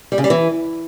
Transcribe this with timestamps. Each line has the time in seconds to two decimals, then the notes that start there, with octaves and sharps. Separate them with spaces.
0.12 G3
0.18 C#3
0.24 G3
0.30 E3